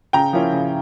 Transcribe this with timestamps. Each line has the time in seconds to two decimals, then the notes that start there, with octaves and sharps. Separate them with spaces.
0.13 C#3 G5 A#5
0.33 F3 A#3 C#4 E4
0.52 C#3